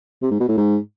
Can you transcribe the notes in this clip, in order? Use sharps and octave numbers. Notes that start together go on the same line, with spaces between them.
C3
G#2
B2
A2
G#2